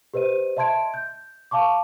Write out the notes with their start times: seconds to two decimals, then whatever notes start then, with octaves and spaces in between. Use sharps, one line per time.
0.14 G4 B4 C5 D#5 D#7
0.57 D#5 E5 A5 C6 G#6 D7
0.94 G6
1.51 F5 A5 C#6 D6